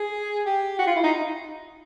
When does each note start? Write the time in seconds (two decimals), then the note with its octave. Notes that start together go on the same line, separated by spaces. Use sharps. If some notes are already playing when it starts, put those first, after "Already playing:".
Already playing: G#4
0.46 G4
0.78 F#4
0.87 F4
0.96 E4
1.03 D#4